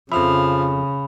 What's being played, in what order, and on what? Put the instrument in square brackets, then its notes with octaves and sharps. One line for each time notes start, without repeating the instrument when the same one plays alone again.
[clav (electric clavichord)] F2 E5 [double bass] C#3 [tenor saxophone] F3 [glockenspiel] B5 F7